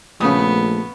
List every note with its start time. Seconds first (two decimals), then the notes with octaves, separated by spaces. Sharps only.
0.20 A#1 C#3 A3 B3 C#5 D#6